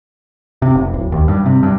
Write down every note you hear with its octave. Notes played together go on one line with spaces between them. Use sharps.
C3
F1
D1
D#2
G2
C3
G2